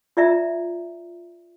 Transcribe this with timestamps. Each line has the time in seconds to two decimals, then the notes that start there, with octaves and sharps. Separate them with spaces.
0.17 F4 D5 E5 A#5